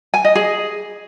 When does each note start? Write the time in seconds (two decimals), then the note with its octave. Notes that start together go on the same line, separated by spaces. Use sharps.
0.14 G#5
0.25 D#5
0.35 G#4